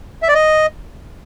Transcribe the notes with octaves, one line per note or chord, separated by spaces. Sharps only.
E5
D5
D#5